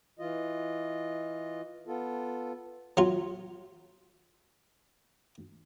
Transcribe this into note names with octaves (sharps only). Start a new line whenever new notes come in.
E3 F4 D#5
B3 F4 A4
F#3 F4